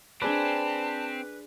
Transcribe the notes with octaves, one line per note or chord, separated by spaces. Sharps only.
C4 D4 G#4 B4 D5 A5